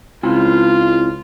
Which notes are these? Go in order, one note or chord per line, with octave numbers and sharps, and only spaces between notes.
C#2 C4 E4 F4 G#5